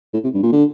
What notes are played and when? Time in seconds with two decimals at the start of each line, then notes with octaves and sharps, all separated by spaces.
0.14 A2
0.24 C3
0.34 G2
0.43 A#2
0.52 D3